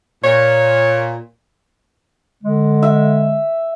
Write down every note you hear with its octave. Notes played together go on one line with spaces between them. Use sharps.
A#2 C#5
D3 G#3
E5